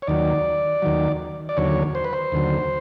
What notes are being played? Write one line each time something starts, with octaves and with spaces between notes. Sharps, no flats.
C#5
D#2 D#3 F#3 D5
D#2 D#3 F#3
D5
D#2 D3 F#3 C#5
C5
B4
C5
D#2 D3 F#3